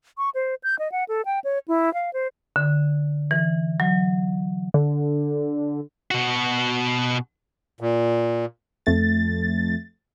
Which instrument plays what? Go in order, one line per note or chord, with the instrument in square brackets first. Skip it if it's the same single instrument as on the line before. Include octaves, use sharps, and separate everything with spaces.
[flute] C#6
C5
G6
D#5
F#5
A4
G5
C#5
E4
F5
C5
[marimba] D3
E3
F#3
[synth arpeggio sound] D3
[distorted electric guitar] B2 F#4
[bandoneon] A#2
[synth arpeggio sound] F2 A3 A6